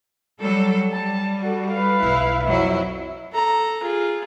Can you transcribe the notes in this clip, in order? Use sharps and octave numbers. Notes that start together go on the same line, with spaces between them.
F#3 G3 A4
G3 A5
F#4 A4
B4 F5
F1 B1 E4
F2 F#3 E4 E5
A4 A#5
F4 G#4